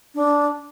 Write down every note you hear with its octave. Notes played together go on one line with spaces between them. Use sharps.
D4